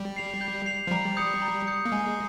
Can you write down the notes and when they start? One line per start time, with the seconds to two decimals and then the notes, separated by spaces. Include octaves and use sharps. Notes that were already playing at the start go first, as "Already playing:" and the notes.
Already playing: G3
0.16 C7 F7
0.41 G6
0.66 C7 F7
0.87 F3
0.91 G3 A#5
1.17 D#6 G6 C#7
1.42 A#5
1.67 D#6 G6 C#7
1.85 A#3
1.92 G#3 G#5